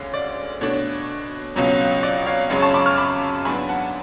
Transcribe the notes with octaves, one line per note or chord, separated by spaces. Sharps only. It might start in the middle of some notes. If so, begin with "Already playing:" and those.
Already playing: D2 D3 G#3 C#4 F5
D5
B2 A3 D4 C#5
C#2 B2 F#3 C#4
D5
C#5 F5
F#2 C#3 G#3 C#4 C#5 F5
A5 C#6
B5 D6
C#6 F6
B5 D6
G#2 F#3 B3 D4 G#5 B5
F#5 A5